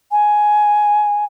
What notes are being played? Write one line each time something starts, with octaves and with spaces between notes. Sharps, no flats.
G#5